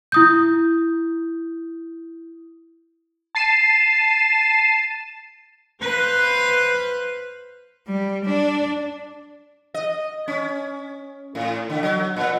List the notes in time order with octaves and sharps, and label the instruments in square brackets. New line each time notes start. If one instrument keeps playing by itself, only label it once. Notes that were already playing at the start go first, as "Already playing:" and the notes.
[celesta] E4 D#6 G6
[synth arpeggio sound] A5 A6 C7 D#7 E7
[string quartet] B4 C5 F5 F#6
[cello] G3
D4
[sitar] D#5
C#4
A2
D3
F#3
A#2